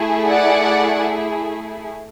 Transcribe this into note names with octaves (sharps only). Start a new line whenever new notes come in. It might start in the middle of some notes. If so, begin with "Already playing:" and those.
Already playing: A3 E4 G#4
D5 F#5